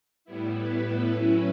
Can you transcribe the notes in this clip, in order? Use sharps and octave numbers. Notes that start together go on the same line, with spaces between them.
A2 G3 B3 E4
B4
A4
A2 F#3 C#4 E4 B4